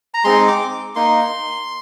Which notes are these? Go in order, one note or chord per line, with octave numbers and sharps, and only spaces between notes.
A#5
G#3 C4 D#4 C6
D6
A#3 D#4 C6